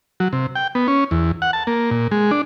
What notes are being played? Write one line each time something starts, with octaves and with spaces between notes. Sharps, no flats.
F#3
C3
G5
B3
C#4
E2
F#5
A5
A#3
A#2
G#3
D4